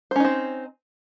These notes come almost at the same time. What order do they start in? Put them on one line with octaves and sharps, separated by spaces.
C5 C#4 D#4 C4